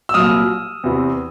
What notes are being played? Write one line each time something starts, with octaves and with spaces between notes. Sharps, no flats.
E6
C2 A#2 F#3 D#6 F6
E2 C3 E3